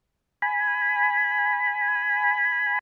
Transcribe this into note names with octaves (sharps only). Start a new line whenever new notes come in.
G#5 B5